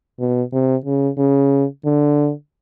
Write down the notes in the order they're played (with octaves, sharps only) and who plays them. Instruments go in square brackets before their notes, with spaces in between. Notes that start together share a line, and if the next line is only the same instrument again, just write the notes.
[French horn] B2
C3
C#3
C#3
D3